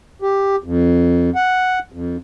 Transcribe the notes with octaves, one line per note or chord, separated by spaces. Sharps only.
G4
F2
F#5
F2